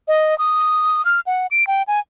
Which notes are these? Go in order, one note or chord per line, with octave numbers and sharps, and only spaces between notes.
D#5
D#6
F6
F#5
D7
G5
G#5